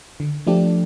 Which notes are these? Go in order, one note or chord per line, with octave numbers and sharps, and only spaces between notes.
D3
F3 A3 D4 G4